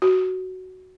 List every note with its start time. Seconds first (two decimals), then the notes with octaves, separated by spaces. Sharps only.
0.02 F#4